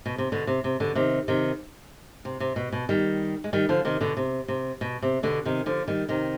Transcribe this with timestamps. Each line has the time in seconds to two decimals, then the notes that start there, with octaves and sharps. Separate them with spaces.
0.06 B2
0.18 C3
0.32 B2 D3
0.47 C3
0.64 C3
0.80 B2 D3
0.95 C3 D#3
1.28 C3 D#3
2.25 C3
2.40 C3
2.56 B2
2.72 B2
2.89 D#3 G3
3.44 G#3
3.53 D#3 G3
3.69 D3 F3
3.85 C3 D#3
4.01 B2 D3
4.17 C3
4.48 C3
4.81 B2
5.02 C3
5.23 B2 D3
5.45 C3 D#3
5.66 D3 F3
5.88 D#3 G3
6.09 C3 D#3